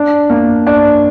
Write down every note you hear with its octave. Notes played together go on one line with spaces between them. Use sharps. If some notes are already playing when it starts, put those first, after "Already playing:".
Already playing: D4
A#3
D4